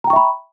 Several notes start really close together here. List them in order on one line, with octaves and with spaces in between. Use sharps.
A#5 G5 C#6 E5 B5